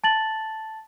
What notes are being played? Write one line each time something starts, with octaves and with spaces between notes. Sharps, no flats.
A5 A6 F#7